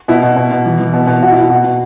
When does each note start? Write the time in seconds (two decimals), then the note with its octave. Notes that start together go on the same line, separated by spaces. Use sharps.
0.08 B2 E4
0.23 B2
0.36 B2
0.51 B2
0.66 E3
0.79 E3
0.93 B2
1.07 B2
1.22 B2 F#4
1.31 E4
1.36 B2
1.41 E4
1.50 B2 F#4
1.64 B2